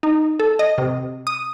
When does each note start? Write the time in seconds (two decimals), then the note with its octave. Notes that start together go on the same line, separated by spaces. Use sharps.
0.03 D#4
0.40 A4
0.59 D#5
0.78 C3
1.27 D#6